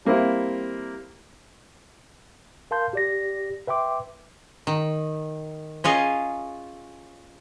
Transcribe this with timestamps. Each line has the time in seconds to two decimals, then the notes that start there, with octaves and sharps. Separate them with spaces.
0.05 G3 A#3 C4 E4
2.71 A#4 F5 A5 C6 G6
2.93 G4 D5 A#6
3.67 B4 E5 G5 C6 D6
4.67 D#3
5.84 C#4 F4 G#4 D#5